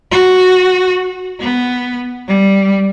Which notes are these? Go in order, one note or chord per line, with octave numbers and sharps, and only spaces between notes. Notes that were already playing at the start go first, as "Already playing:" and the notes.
F#4
B3
G3